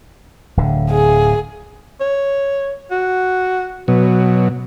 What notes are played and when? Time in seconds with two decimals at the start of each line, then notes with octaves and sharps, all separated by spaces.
0.57 D1 D3
0.90 G#4
2.00 C#5
2.91 F#4
3.88 B2 F#3 B4